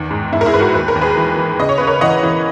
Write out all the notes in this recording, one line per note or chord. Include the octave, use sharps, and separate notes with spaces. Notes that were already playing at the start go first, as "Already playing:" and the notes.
Already playing: E2 D#3
G#2
G#2 E4
A#4
E4 G#4
G#2 B4
F#4 A#4
D#2 B4
A#4
D#2
G#4 B4
E3
E3
C#3 D#5
C#5
C#3 B4
A#4 C#5
E3 D#5 F#5
E3